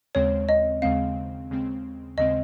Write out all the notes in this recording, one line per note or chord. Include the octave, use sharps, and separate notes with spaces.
D#2 C#3 G#3 C4 C#5
D#5
D#2 C#3 G#3 C4 F5
D#2 C#3 G#3 C4
D#2 C#3 G#3 C4 D#5